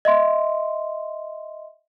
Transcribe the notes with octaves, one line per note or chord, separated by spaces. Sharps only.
D#5 E5 C6